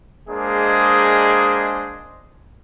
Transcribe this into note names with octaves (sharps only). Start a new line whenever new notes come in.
G#3 A#3 D4 G#4 C5 D#5